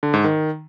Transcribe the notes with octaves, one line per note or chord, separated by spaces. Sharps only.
D3
G#2
D#3